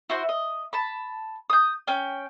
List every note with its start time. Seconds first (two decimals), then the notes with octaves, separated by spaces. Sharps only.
0.10 E4 F#4 C5
0.29 D#5
0.73 A5 B5
1.50 D#6 G6
1.87 C#4 G5